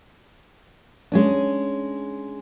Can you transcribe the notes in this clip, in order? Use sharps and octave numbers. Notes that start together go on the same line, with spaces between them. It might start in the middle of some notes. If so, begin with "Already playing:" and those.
G#3 C#4 D4